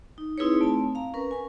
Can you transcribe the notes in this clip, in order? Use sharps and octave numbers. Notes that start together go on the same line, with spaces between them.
D#4
C4 D#4 E4 G#4 B4 C#5
A3 C4 A5
F5 A#5
C#4 A#4 B4
G#5 C#6